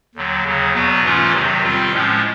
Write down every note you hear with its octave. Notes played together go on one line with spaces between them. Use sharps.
D#2 D3 F#3
D#2 C#3 F#3
E2 B2 F#3 B3
G#2 E3 A3 C#4 F4
E2 C3 D#3 F#3
D#3 G3 C4 F4
A2 F3 G#3 C#4